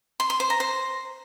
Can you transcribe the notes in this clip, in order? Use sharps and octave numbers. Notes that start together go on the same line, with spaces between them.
C6
C6
C5
A#5
C5